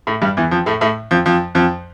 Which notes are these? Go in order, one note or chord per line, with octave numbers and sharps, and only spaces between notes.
A2 A3
G2 G3
E2 E3
F2 F3
A2 A3
A2 A3
F2 F3
F2 F3
F2 F3